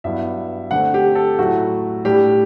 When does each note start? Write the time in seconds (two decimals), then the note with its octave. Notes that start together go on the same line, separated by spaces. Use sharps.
0.04 G2 F#3 B3 E4 E5
0.71 D3 A3 C4 F#5
0.94 G4
1.15 A4
1.39 A2 F#3 A3 E4 F#4
2.05 A2 G3 D4 G4